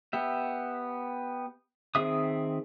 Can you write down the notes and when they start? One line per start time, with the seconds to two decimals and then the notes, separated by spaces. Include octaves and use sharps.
0.13 B3 G4 E5
1.95 D#3 C4 G#4 E5 D#6